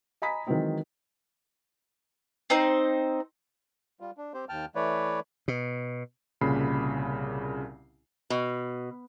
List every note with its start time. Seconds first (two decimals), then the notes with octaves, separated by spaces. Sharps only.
0.22 D#5 G#5 A#5 B5 D#6 B6
0.47 D#3 E3 F#3 G#3 C4 D#4
2.50 C4 D#4 C5
4.00 G3 F4
4.18 D4
4.34 C4 G4 C5
4.49 D#2 G5 A5 F6
4.75 E3 A3 B4 C#5 D5
5.48 B2
6.41 C2 A#2 C#3 B5 C7
8.30 B2